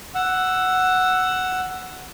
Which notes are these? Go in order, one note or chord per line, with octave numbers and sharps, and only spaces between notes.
F#5 E6